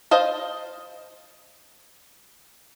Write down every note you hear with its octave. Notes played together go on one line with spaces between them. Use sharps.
C5 D#5 F5 A5